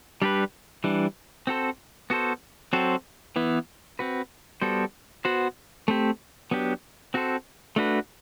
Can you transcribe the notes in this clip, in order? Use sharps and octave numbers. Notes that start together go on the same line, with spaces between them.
G3 D4 G4 B4
E3 G3 D4
C4 F#4 A4 C5
B3 F#4 A4 C5
F#3 C4 F#4 A4 C5
E3 B3 E4
C4 F#4 B4
G3 B3 F#4 A4 C5
B3 F#4 C5
A3 C4 G4
F#3 B3 D4 G4
C4 F#4 A4 C5
A3 D4 F#4 B4